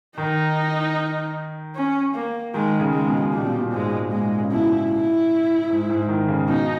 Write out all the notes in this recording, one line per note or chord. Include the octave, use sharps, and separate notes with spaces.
D#3 D#4
C#4
A#3
D#3 G#3
C#3
G#3
B2
A#2 G3
B2
A#2
G#2 G#3
A#2 G#3
C#3
B2 E4
E4
G#2
G#2
D#3
C#3
B2 D#4